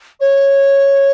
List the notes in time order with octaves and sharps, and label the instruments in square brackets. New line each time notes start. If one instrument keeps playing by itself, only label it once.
[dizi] C#5